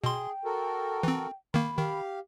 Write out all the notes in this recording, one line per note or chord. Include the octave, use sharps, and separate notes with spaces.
B2 G#4 G5 C6
F#4 A4 A#4
E3 C4
D#3 A#3 B5
D#3 G4 F5